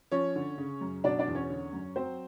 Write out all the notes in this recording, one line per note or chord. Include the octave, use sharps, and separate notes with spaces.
F3 C#4 C#5
D3
C#3
F#2
B2 D4 D5
D4 D5
E2
C#4 C#5
D3
F#2
F#3 C4 C5